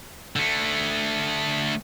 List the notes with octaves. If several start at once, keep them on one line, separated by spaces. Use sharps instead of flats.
D3 A3